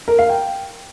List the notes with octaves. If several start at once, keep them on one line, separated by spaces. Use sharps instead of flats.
A#4
F5
G5